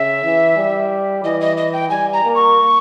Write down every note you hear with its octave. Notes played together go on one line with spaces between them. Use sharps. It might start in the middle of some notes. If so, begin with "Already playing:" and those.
Already playing: C#3 E5
E3
G3
E3 D#5
D#5
D#5
G5
G3 G#5
A#5
A#3
C#6